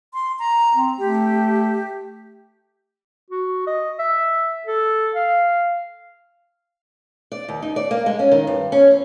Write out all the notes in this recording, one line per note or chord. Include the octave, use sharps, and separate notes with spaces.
C6
A#5
C4
A3 G4
F#4
D#5
E5
A4
F5
D5
D#2
D#4
D5
A#3
G#3
C#4
D#3
G2
C#4
E2